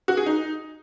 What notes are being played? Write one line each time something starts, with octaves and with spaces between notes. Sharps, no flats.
F#4
G#4
D#4